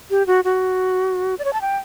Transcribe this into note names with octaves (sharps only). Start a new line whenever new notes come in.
G4
F#4
F#4
D5
C#5
A5
G5